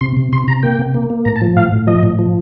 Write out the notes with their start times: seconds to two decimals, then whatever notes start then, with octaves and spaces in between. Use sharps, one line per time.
0.01 C3 C6
0.17 C3
0.33 C3 C6
0.48 C3 A#5
0.63 A#3 G5
0.79 C3
0.94 A#3
1.10 A#3
1.25 A2 A#5
1.36 A5
1.41 F3
1.56 A2 F5
1.72 A2
1.87 F3 D#5
2.03 A2
2.19 F3